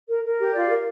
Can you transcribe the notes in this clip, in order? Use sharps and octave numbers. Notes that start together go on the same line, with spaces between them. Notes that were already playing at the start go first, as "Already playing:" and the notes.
A#4
A#4
G4
F4 D5
A#4